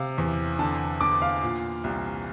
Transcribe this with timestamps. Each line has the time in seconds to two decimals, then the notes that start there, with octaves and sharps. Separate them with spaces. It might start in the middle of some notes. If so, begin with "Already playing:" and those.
Already playing: C3 F5
0.18 E2
0.59 D3 A5
1.01 D3 D6
1.22 F5
1.42 A#2
1.84 C2